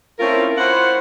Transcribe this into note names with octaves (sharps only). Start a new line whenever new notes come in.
A3 C4 C#4 E4 F4 A#4
E4 F4 C5 C#5 F#5